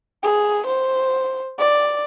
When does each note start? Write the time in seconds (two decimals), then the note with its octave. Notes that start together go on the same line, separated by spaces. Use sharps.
0.23 G#4
0.67 C5
1.59 D5